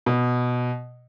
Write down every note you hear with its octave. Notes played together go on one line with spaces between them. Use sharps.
B2